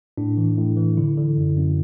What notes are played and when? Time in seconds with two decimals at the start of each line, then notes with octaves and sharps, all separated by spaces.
0.18 A2 D4
0.37 E3
0.57 A2
0.77 E3
0.97 D3 E4
1.18 D3
1.37 F#2
1.57 F#2